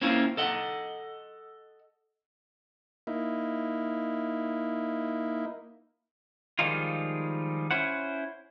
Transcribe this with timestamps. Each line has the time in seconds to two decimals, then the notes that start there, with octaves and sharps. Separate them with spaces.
0.01 A#3 C4 C#4 E4 F4
0.37 A4 D#5 F#5
3.07 A#3 D#4 E4
6.59 D#3 F3 G3 G#3 D#4 F4
7.71 C#4 E4 C5 F#5